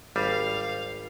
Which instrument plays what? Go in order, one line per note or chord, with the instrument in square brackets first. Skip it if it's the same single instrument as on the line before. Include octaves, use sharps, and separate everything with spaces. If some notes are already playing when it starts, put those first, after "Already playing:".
[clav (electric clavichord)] G#1 G3 [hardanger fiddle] F5